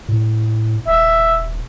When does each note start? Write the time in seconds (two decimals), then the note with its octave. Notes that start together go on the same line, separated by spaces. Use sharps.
0.09 A2
0.87 D#1 E5